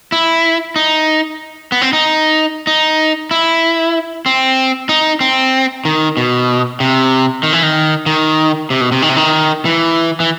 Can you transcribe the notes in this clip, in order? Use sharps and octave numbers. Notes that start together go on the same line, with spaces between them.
E4
D#4
B3
C4
D#4
D#4
E4
C4
D#4
C4
D#3
B2
C3
D#3
E3
D#3
D#3
C3
B2
C3
D#3
C3
D#3
E3
E3